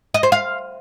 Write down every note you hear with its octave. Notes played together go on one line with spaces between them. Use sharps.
D#5
C5
F5